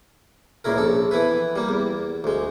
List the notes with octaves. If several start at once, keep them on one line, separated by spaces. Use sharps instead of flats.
C#2 A#2 C#3 E4 A#4
A#1 A4
E3 B3 E4 B4
G3 A#3
E2
D2 G#3